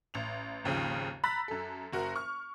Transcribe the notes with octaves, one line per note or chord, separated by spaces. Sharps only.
A1 F7
G#1 D#2 C#3 F3
A#5 B5 E6 F#6 A6 B6
F#2 A4
F#1 F#4 A#4 A#5
C#6 F6